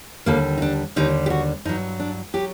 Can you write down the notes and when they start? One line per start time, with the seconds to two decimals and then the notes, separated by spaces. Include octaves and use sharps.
0.26 D#2 D3 G3 A#3
0.58 D#4
0.62 D4
0.96 D#2 D3 G3 D#4
1.26 G4
1.30 F#4
1.65 G2 F#3 D#4
2.00 D4
2.34 F#3 G4